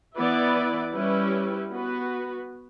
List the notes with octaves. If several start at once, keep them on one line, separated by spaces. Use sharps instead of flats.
E3 B3 E4 B4 D5
G3 C#4 E4 G4 B4
B3 F#4 B4